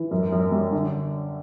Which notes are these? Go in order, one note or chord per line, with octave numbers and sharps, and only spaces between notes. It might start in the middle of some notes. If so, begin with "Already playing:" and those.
Already playing: E3
F#2
F#2
G3
D3